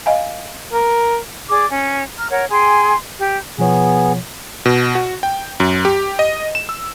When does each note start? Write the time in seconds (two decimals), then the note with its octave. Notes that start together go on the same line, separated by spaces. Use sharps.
0.06 D#5 F5 G#5
0.73 A#4
1.49 G#4 D5 D6
1.71 C#4
2.18 A#5 F6
2.30 A#4 C#5 F#5
2.50 G#4 G5 G#5 C6
3.18 G4
3.58 B2 F3 B3 G#4 C#5
4.66 B2
4.95 F#4
5.23 G5
5.60 F#2
5.85 G4
6.19 D#5
6.55 E7
6.69 E6